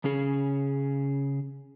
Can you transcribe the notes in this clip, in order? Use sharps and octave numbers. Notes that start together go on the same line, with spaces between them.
C#3 C#4 G#4